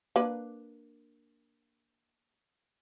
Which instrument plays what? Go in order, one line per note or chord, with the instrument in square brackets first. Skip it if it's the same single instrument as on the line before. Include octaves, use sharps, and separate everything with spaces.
[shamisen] A#3 D4 B4